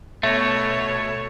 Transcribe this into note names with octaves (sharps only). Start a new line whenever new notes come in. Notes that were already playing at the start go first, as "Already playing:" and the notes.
B2 A3 C#5 E5 A#6